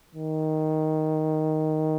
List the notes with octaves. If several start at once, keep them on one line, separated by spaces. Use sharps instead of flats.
D#3